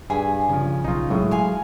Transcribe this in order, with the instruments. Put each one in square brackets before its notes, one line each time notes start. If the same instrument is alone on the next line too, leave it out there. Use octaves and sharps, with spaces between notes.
[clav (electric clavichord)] G2 [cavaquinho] G#4 G#5 B5
[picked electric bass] C#3 F3
[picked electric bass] B1 C#3 [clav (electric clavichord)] D#4 F4
[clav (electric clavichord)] A2 [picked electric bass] F#3 G#3
[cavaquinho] F5 G#5 C6